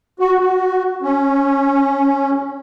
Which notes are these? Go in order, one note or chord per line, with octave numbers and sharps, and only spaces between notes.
F#4
F#4
C#4